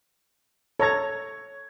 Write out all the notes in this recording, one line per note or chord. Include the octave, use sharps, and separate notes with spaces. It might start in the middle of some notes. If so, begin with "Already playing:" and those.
A4 C#5 A#5 G#6